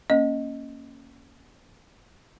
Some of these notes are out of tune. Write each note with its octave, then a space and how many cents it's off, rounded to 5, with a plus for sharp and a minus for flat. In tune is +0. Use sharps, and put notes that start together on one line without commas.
A#3 +0 C#4 +0 D#5 +0